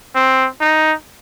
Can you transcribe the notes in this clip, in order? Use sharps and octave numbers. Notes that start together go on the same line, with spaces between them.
C4
D#4